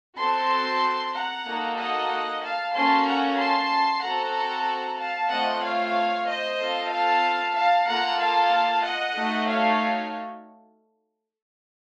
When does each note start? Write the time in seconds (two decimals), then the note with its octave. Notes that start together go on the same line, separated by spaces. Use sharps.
0.18 C4 F#4 A4 A5 C6
1.14 F#5 A#5
1.47 A#3 D#4 F#4 A4
1.79 D#5 F#5
2.43 F5 A5
2.75 A#3 C#4 F#4 A4 A5 C6
3.07 F#5 A#5
3.39 A5 C6
4.03 C4 F#4 A4 F#5 A#5
4.99 F5 A5
5.31 A3 C4 F4 D#5 F#5
5.63 C#5 F5
6.27 C5 D#5
6.60 C4 F4 A4
6.91 F5 A5
7.56 F5 A5
7.88 A#3 F4 A4 F#5 A#5
8.20 F5 A5
8.84 D#5 F#5
9.16 A3 D#4 F#4 A4
9.48 C#5 F5